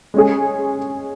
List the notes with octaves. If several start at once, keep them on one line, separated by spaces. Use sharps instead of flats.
G#3 C#4 G#4